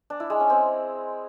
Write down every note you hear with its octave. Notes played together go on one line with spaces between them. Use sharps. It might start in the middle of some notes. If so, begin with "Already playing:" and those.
D4
E4
G#3
C#4
C4